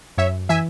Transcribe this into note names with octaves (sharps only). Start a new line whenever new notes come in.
F#2 C#5 E5
E3 E5 G#5